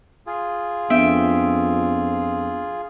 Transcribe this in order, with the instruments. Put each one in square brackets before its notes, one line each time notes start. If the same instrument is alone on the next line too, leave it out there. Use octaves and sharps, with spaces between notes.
[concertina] F4 G#4
[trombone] F2 [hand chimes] B3 D4 E6 [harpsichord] E5 G5